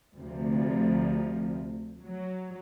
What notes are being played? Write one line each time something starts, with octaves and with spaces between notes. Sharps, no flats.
D2 C3 F3
F#3